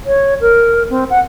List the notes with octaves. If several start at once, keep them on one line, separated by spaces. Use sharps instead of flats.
C#5
A#4
C4
F#5